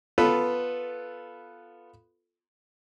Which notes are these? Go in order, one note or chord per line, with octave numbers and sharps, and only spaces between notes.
B3 F4 A4 B4